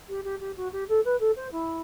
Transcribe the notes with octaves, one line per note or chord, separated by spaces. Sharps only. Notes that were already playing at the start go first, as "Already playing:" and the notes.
G4
G4
G4
F#4
G4
A4
B4
A4
C5
E4